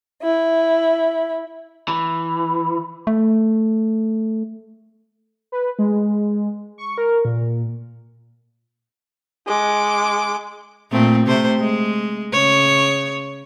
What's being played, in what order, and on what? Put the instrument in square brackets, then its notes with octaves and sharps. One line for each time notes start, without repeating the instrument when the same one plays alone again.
[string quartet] E4
[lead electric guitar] E3
[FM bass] A3
[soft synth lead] B4
G#3
C#6
A#4
A#2
[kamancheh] G#3 D6
[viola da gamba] A#2 A3 C4
C3 A3 C5
G#3
C#3 C#5